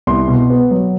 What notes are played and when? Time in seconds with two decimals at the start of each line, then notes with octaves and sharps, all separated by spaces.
0.07 C2 C6
0.28 B2
0.50 B3
0.71 F#3